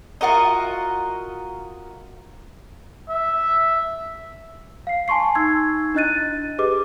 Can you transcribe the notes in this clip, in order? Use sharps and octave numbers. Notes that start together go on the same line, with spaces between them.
F4 F#4 A#4 D#5
E5
F5 C7
G#5 A5 C6 C#6 C7
D#4 E6 G#6
D4 E4 D#5 F#6 A6 D#7
G4 G#4 B4 D#5 D6